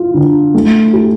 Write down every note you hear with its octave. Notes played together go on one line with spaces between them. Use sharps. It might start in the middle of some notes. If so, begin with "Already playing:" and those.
Already playing: F4
D3
A3
G4